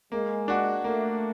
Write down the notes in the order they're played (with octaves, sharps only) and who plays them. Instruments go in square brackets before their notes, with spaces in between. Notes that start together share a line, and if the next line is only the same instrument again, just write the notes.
[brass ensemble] G#3 [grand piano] A#3
[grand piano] D4 F#4
[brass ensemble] A3 [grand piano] A#3